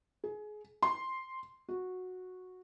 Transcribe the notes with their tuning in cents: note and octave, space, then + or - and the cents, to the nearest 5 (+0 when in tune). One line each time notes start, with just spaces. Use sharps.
G#4 +25
C6 +0
F#4 -10